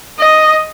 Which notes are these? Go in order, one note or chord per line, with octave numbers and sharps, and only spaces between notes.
D#5